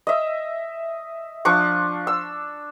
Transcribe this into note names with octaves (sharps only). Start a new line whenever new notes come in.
D#5 E5
F3 D4 C#6
E6